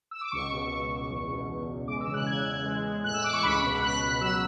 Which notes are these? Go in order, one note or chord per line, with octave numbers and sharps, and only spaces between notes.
E6
D6
C#2 C#6
B2
C#2
C#2
E2
B2
E2
E2
G#3 D6
E6
C#3
F#6
E2 G#6
E2
G#3
G#3
A2 F#6
E6
G#3 D6
C#6
C#2 B5
B2
C#2 F#6
C#2
F#3 E6